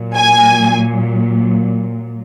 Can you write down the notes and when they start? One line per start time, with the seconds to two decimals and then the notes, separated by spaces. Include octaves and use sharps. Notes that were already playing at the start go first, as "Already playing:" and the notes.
Already playing: A#2 F#3
0.15 G#5